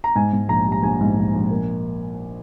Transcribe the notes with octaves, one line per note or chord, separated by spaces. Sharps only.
A#5
G#2 G#5
G#2
A#1 A#5
G3
A#5
A#1 G#5
G#2
A#1
A#1
A#3